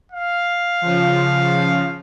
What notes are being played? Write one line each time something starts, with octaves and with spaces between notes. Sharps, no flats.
F5
C#3 F3